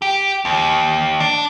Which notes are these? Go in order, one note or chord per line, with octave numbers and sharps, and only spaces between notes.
G4
D#2
D4